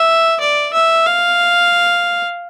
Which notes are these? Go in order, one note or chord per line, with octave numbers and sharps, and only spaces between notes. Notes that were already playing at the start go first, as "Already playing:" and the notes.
Already playing: E5
D5
E5
F5